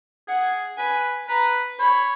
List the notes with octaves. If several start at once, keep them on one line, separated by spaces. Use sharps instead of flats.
G#4 F#5
B4 G#5
B4 A#5
C#5 B5